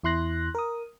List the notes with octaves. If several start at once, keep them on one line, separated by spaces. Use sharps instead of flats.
E2 E4 C6 F#6 A#6
A#4 D#6